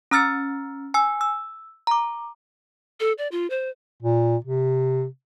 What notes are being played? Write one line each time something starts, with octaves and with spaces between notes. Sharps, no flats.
C#4 A#5 E6 F6 A6 C#7
G#5 E6
E6
A#5 D6
A4
D5
F4
C5
A#2
C3